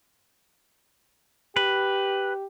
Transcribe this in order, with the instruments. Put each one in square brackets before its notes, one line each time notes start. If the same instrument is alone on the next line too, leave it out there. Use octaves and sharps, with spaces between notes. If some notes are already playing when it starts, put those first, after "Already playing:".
[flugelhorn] G4 [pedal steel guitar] B4